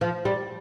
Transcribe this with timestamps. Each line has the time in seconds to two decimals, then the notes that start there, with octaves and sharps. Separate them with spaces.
0.01 F3
0.25 G3